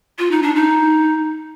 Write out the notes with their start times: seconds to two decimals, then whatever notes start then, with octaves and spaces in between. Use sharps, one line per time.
0.19 F4
0.31 D#4
0.42 D4
0.55 D#4